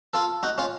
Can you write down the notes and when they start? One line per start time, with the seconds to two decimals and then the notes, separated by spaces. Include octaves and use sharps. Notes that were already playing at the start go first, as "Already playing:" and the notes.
0.14 F4 A4
0.43 D#4 F#4
0.58 C#4 F4